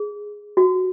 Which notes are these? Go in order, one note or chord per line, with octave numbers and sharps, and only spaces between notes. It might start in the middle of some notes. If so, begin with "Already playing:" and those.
Already playing: G#4
F#4